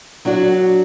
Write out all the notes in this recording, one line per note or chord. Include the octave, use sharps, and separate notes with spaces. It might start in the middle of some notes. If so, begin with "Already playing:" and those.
F#3 D4 F#4